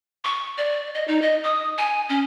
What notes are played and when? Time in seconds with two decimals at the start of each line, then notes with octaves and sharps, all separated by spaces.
0.24 C#6
0.58 D5
0.95 D#5
1.08 D#4
1.22 D#5
1.44 D#6
1.78 G#5
2.09 C#4